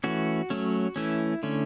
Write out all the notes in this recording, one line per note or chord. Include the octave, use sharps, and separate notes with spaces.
E3 A3 C#4 F#4
F#3 A3 C#4
E3 A3 C#4 E4
D3 A3 C#4